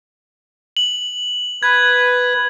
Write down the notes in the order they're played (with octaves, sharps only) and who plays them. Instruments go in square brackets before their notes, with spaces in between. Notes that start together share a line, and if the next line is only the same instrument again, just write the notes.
[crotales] F#7
[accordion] B4 [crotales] G#6